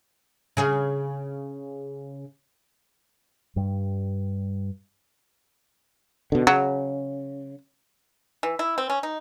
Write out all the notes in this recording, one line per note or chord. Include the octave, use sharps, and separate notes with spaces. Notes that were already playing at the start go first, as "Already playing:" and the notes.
C#3 G#4
G2 G3
B2 D3
C#3 F#3
E3
E4
C4
C#4
D#4